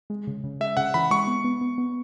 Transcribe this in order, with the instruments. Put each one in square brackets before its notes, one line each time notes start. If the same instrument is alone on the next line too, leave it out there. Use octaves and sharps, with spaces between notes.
[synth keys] G#3
C#3
C#3
[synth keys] G#3 [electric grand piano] E5
[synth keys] C#3 [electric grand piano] F#5
[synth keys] E3 [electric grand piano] B5
[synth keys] G#3 [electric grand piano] C#6
[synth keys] B3
B3
B3
B3